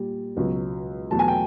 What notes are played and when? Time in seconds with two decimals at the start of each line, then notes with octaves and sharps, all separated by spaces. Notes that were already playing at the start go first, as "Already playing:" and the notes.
Already playing: A#2 G3
0.36 C#2 B2 F#3
1.11 E2 B2 F#3 A3 A5
1.19 G#5
1.28 G5